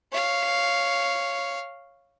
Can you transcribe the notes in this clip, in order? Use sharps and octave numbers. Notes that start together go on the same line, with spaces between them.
C#5 F5